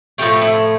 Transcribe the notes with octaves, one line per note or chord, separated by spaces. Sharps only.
A2 F3 A3 G4
E4